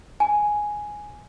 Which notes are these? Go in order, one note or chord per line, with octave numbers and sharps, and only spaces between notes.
G#5